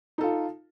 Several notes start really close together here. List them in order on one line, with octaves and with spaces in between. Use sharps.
D#4 A4 F4